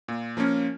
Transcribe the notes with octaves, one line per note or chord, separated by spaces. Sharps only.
A#2
F3 A#3 C#4